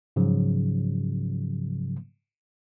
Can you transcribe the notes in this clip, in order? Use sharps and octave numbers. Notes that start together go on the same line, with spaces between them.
G#2 C#3 F3 F#3